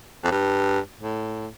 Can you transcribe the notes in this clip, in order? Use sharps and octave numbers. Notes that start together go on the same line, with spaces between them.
F2
G2
A2